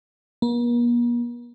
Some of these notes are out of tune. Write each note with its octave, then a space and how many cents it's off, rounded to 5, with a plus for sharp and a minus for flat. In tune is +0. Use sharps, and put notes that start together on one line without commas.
A#3 +45